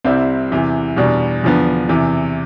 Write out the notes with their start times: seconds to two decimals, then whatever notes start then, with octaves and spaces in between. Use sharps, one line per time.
0.04 C2 C3 G3 C4 E4
0.51 E2 C3 E3
0.96 E2 B2 G3 D4
1.44 E2 D3 F3 B3
1.89 E2 C3 E3